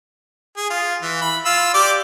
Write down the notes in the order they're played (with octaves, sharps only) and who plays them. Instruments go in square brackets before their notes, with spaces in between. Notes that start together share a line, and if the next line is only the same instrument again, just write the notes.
[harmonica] G#4
F4
E3
B5
F4 E6
G4 D5 D6